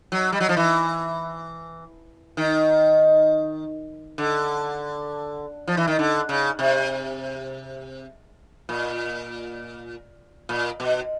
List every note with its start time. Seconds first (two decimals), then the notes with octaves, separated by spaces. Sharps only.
0.12 F#3
0.32 G3
0.40 F#3
0.49 F3
0.57 E3
2.37 D#3
4.18 D3
5.67 F3
5.77 E3
5.88 D#3
5.99 D3
6.29 C#3
6.59 C3
8.69 A#2
10.49 A#2
10.80 B2